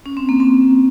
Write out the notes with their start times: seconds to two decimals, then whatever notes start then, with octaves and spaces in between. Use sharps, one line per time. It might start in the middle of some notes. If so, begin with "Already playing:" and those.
0.06 C#4
0.17 C4
0.29 A#3
0.40 C4